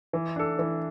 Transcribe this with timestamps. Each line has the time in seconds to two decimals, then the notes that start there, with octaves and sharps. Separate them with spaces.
0.13 E3
0.36 D4 A4
0.59 E3